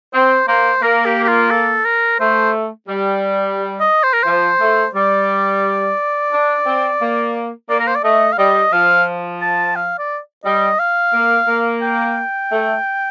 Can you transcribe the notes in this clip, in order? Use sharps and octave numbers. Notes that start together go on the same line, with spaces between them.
C4 C5
A#3 C5
A#3 A#4
G4
G4
F4
A4
A#4
A3 C5
G3
D#5
C5
A#4
F3 C5
A3
G3 D5
D4
C4
A#3
A#3 D5
A#4
C5
D5
A3 D#5
F5
G3 D#5
F3 F5
A5
F5
D5
G3 D#5
F5
A#3
A#3
G5
A3